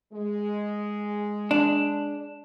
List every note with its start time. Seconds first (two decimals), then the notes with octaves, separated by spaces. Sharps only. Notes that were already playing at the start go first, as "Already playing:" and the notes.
0.13 G#3
1.51 D4